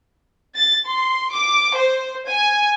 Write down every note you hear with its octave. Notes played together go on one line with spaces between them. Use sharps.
A6
C6
D6
C5
G#5